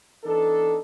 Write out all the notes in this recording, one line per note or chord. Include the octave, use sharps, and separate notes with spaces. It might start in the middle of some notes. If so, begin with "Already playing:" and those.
E3 B3 D4 D#4 A4